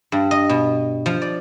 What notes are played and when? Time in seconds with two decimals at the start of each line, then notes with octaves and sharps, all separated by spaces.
0.12 G2
0.31 D#5
0.49 B2
1.06 F3
1.22 D5